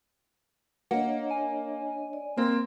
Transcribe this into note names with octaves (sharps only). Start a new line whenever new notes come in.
A#3 D4 C#5 D#5 F#5
G#5
D5
A#3 C4 C6